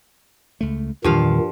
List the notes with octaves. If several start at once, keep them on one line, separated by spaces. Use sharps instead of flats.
C#2 A3
E2 G2 A#2 D#3 F3 G3 F5